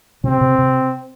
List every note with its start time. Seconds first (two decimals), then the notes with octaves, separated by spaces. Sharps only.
0.24 C3 C4
0.41 C3
0.58 C3